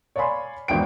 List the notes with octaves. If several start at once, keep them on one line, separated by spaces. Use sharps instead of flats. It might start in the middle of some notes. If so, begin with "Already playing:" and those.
C#5 D5 F5 G#5 B5 C6
G#1 E2 D4 G5 D7